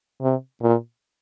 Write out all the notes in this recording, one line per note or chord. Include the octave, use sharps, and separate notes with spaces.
C3
A#2